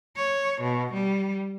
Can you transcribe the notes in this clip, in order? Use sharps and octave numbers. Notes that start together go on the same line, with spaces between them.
C#5
B2
G3